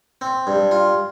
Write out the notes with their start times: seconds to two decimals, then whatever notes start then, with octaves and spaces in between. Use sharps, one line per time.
0.21 C4
0.47 G2
0.71 F4